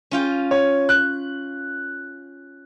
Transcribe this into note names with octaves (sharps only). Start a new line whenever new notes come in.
C#4 F4 G5
C#5
F#6